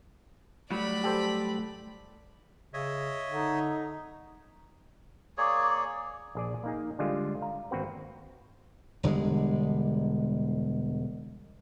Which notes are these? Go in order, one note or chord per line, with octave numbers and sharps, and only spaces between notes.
A2 F#3 G3 D5 B5
G4 A4 C5
C#3 C#5 D#5 E5
D3 D#4
A#3 G#4 C#5 D5
A#1 G#4 D5
A#3 D#4 G#4
D3 G3 G#3 F4
F5 A#5
G#1 A#3 C4 F#4 B4
E1 D3 G3 G#3